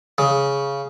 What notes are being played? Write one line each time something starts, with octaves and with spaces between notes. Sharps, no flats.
C#3